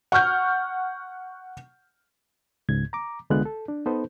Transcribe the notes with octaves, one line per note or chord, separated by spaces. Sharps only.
F#5 C#6 F6 G6
C#2 G#2 G#6
A#5 D6
C2 D3 G#3 B3 F4 F#6
A4
D4
B3 D#4 A4 B4 C5